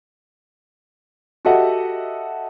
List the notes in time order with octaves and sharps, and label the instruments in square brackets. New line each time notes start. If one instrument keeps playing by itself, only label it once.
[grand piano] F#4 G4 A4 D#5 E5 F#5